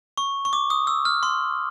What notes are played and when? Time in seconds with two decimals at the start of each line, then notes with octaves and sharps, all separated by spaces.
0.18 C#6
0.45 C#6
0.53 D6
0.70 D#6
0.87 E6
1.05 F6
1.23 C6